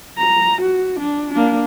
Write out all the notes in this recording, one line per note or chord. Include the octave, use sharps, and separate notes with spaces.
A#5
F#4
D4
A#3 D4